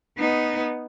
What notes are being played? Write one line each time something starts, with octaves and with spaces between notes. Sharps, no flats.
B3 D#4